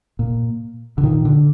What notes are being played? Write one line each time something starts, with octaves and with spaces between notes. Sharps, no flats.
A#2
D3
A#2 D#3
D3